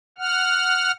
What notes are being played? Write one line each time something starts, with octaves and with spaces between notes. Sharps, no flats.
F#5 F6